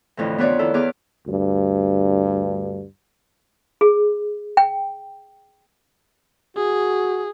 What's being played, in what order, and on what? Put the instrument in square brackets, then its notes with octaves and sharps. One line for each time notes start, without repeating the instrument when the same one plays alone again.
[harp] F2 A2 D3 E3
B3 D4 F4 B4 C#5 D5
D#3 E4 A4
E2 B3 G#4 D6 F6
[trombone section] D2 G2
[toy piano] G#4
G5
[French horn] F#4 [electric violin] G#4